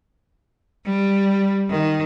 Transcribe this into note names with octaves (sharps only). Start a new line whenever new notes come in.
G3
D#3